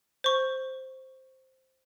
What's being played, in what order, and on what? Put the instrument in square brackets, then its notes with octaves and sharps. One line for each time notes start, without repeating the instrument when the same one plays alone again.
[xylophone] C5 C#6